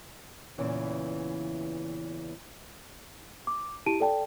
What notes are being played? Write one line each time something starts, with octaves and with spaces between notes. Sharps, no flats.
E2 A#2 C#3 E3
D6
E4 G4 A5 D7 D#7
A4 D5 G5 A5